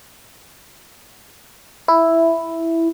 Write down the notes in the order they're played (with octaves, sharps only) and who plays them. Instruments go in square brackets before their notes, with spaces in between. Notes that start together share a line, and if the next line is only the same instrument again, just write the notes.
[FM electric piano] E4